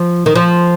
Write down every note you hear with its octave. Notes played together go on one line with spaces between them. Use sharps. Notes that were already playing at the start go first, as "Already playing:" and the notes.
Already playing: F3
D#3
F3